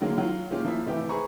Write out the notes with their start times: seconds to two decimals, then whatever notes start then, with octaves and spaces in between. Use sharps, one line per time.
0.01 D3 D#3 F#3 G#3 A#3
0.18 F#3 F4
0.50 A#2 D#3 G#3 C#4 F4 G4
0.65 F3 A#3 E4 E5
0.86 G#1 C3 E3 A3 G4
1.09 G#4 B4 C5 A#5 C#6